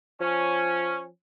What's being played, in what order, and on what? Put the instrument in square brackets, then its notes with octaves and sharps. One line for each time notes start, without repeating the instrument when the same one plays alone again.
[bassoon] F3 [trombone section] C#4